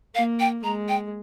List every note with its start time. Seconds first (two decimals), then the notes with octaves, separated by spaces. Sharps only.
0.15 A#3 F5
0.40 G5
0.64 G#3 A#5
0.89 G5